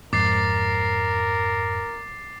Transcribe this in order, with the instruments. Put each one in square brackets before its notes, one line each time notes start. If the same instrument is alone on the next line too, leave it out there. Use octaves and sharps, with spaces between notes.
[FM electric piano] F2 G#2 [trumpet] A#4 [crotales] D6 A6 C7